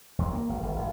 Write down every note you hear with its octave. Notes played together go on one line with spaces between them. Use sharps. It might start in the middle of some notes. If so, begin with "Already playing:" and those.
D#2
A#3
G#1
G1
G#1